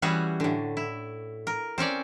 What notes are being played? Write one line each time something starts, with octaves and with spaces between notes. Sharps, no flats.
E3 G3 C#4 F#4 G#4
A2 D3
E4
A#4
C4 C#4 C#5 D5